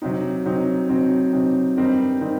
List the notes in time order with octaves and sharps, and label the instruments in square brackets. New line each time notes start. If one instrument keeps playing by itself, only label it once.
[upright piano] C3 F#3 C4 D#4
C3 F#3 C4 D#4
C3 F#3 C4 D#4
C3 F#3 C4 D#4
G2 D#3 G3 C4 D#4
D#3 G3 C4 D#4